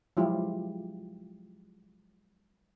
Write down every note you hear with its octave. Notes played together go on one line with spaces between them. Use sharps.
F3 F#3 G#3 E4 F4 G4